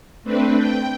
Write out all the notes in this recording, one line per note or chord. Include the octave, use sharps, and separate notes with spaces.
A3 C4 D4 B4
G5